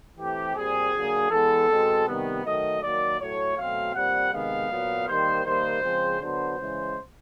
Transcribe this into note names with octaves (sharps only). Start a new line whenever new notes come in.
E3 A3 C4 G4
A#2 G3 C4 G#4
D3 F#3 A#3
E3 G#3 B3 A4
B2 G#3 C4
C3 D#3 G3 B3
D#3 F#3 A3 D#5
D#3 F#3 A#3 D5
A2 F#3 A3 C#5
B2 F#3 A3 C4 F5
A#2 G3 C4 F#5
C3 D#3 G#3 B3 F5
A#2 F#3 B3
D#3 G3 A#3 C5
D#3 G3 A#3 C5
C#3 F3 G#3 C4
D3 F#3 B3 C5
C#3 E3 G#3